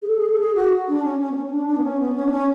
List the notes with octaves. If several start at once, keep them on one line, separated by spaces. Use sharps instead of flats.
G#4
A4
G#4
A4
G#4
F#4
D4
C#4
C#4
B3
C#4
C#4
D4
D4
B3
C#4
B3
C#4
D4
C#4